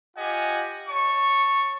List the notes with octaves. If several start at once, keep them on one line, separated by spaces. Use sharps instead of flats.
F4 G4 D#5 F#5 G#5
C#5 A5 C#6